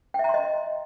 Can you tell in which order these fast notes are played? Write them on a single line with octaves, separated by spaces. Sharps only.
G5 E5 A#5 C6 D#5